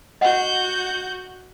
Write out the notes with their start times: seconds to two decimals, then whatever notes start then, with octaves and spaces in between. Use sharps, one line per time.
0.21 F#4 D#5 F#5 G6